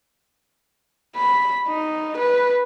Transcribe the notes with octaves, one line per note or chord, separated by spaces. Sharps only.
B5
D#4
B4